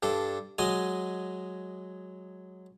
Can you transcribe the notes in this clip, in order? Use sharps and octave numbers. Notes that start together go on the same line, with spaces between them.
G2 D4 A4
F#3 G#3 D#5 G#5